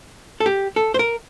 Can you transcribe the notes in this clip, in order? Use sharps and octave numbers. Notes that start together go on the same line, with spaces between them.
A4
G4
A4
C5
A#4